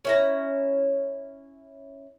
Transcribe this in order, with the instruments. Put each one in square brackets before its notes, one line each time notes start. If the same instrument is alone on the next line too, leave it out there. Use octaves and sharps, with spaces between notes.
[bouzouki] C#4 E4 A#5